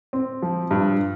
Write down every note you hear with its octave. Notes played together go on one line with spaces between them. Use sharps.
C4
F3
G2